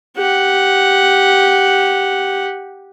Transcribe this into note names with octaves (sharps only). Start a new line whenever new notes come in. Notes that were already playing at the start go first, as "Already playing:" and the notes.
G4 F#5